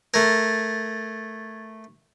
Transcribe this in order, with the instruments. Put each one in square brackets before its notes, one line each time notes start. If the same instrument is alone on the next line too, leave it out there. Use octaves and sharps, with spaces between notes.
[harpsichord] A3 A#4 [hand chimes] G#6 A6